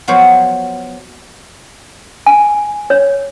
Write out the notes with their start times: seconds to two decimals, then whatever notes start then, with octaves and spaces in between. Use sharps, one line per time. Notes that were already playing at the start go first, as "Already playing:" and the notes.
0.08 F3 F#3 B3 F#4 C5
2.26 G#5
2.90 C#5